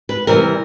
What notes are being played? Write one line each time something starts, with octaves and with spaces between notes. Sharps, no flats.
B4
C3 E3 G3 A#4